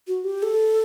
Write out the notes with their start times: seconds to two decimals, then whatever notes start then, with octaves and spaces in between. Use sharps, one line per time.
0.08 F#4
0.24 G4
0.43 A4